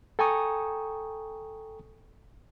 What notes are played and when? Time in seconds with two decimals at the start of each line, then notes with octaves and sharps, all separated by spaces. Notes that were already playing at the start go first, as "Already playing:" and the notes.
0.19 A4 G5 G#5 A#5 C#6 D#6